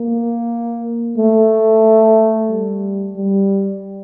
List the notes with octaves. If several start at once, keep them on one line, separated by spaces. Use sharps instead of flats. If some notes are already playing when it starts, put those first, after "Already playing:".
Already playing: A#3
A3
G3
G3